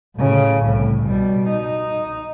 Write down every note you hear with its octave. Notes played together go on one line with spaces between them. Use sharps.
A2 C#3
C2 A2
B2 G3
D#4